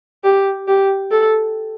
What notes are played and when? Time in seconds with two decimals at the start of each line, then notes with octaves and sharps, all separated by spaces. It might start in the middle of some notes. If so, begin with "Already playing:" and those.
0.24 G4
0.68 G4
1.12 A4